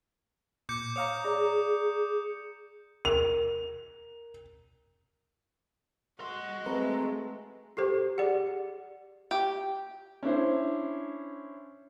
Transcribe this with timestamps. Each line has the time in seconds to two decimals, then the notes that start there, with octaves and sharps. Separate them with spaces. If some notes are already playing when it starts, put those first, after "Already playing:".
0.69 A#2 D6 G6 C#7
0.96 C#5 F5 A#5 D#6 C#7
1.24 G#4 D5 A#5
3.05 A#4 F7
6.20 F#4 D#5 C6
6.66 G#3 A3 C4 B4 A#5
7.77 F#4 G4 A4 C5 C7
8.18 G4 G#4 D5 F#5
9.31 G4
10.23 C#4 D4 E4 C5